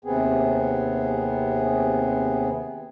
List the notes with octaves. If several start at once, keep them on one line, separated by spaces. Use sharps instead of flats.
D#2 C3 B3 C4 G#4